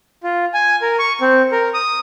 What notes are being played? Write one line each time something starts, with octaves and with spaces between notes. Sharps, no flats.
F4
G#5
A#4
C#6
C4
A#4
D#6